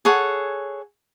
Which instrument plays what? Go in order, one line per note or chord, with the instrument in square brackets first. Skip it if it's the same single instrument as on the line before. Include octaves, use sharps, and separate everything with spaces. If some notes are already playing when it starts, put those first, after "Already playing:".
[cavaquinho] G#4 A4 C#5 F#5